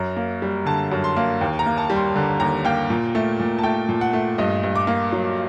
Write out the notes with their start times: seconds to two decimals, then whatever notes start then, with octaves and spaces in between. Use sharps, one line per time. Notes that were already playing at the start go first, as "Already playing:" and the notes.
Already playing: F#2 A#5
0.17 A#3
0.42 G3
0.66 D3 A5
0.92 F#2
1.04 C6
1.17 A#3
1.41 D#2
1.59 A#5
1.66 A#3
1.78 A5
1.90 G3
1.96 C6
2.16 D3
2.40 D#2 A#5
2.65 A#3 G5
2.90 A#2
3.15 A3
3.39 A#2
3.59 A5
3.63 A3 G5
3.89 A#2
4.01 F#5
4.13 A3
4.38 G2 D#5
4.63 G2
4.75 D6
4.87 A#3
5.12 F#3